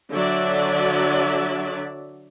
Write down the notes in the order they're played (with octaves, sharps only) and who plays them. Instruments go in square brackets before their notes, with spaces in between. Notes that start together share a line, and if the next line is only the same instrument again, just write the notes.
[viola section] D3 F#3 D5 E5